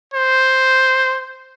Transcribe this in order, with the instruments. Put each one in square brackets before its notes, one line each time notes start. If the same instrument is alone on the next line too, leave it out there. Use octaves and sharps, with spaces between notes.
[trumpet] C5